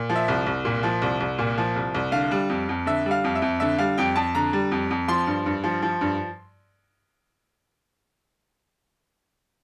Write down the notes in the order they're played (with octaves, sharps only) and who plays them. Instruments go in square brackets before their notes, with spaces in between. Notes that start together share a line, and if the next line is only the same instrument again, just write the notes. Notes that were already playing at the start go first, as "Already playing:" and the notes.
Already playing: [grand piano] A#2
F3
E5
C2
C2
A#2
F3
C2
C2
A#2
F3
C2
C2
D3 F5
G3
F2
F2
D3 E5
G3
F5
F2
E5
F2
D3 E5
G3 F5
F2 G5
F2 A5
D3 A#5
G3
F2
F2
F3 C6
G2
G2
F3
F3
G2